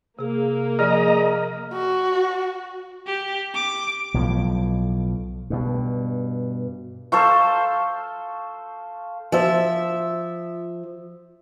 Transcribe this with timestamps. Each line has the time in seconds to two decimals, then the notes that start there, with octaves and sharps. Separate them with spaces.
0.19 C3 A#3 G#4
0.79 F3 G#4 D5 D#5 A#5 F6
1.73 F#4
3.07 G4
3.54 D6
4.14 B1 A2 F3
5.50 G2 B2
7.12 A4 C5 F5 C#6
9.32 F3 E5